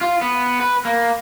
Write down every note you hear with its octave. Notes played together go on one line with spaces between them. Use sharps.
F4
B3
B4
A#3